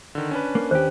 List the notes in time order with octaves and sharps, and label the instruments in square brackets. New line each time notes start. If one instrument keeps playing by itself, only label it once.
[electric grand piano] D3 D#3
C#4 D4 B4
[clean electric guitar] A#3
[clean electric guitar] D#2 G4 [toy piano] C5